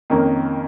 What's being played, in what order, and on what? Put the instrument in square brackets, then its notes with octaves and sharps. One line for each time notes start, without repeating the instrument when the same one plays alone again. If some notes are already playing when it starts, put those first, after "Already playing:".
[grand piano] F2 D#3 A#3 C#4